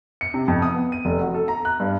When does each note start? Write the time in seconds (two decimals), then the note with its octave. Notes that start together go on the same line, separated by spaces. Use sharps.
0.21 C#7
0.34 C3
0.48 F2
0.62 D#6
0.74 B3
0.92 D#7
1.05 F1
1.21 F#4
1.34 A4
1.48 A#5
1.65 F#6
1.80 G2